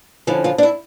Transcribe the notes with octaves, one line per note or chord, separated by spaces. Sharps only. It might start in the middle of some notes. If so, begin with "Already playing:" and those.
D3 F3 C#4 E4
F3 F4
D4
E4